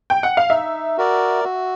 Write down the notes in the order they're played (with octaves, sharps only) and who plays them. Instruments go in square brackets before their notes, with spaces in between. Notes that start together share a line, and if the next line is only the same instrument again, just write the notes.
[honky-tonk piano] G5
F#5
F5
[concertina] D#4 [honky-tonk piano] E5
[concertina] F#4 A#4 D5
F#4